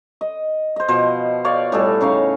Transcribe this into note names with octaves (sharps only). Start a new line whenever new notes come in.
D#5
C5 D#5
B2 F3 C5
C#5 D5 F5
A2 G3 G#4 A4
C#3 D#4 C#5 F5